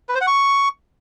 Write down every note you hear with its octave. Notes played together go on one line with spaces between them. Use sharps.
B4
C5
F#5
C#6